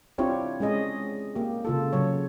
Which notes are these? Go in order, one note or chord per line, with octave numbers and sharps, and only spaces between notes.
C4 D4 E4 F4 G4 C#5
G#3 C#4 G#4 D#5
A#3 G4
C#3 F4 A4
C#3 F#3 C#5